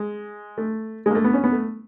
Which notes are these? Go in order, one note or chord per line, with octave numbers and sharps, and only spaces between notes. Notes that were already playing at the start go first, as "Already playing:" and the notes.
Already playing: G#3
A3
G#3 A#3
A3
B3
C#4
B3
A3